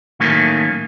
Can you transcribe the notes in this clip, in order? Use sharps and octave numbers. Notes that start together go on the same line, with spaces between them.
A2 D#3 F#3 A3 A#3 C#4